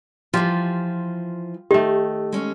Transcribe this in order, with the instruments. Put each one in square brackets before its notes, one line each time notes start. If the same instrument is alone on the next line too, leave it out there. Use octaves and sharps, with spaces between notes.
[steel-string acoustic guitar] E3 F3 [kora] F4 G4
[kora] D#3 A3 [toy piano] G4
[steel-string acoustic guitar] G#3 C#4